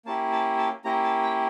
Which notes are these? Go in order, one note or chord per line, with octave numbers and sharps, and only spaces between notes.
A#3 C#4 E4 G4 A5
A5
A5
A#3 C#4 E4 G4 A#5
A5
G5